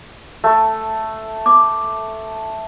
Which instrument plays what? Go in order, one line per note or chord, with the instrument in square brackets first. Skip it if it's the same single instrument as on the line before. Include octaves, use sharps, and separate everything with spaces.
[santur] A3
[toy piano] D6